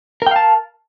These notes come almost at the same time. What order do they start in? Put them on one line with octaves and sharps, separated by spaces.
A#4 G5 F5 A5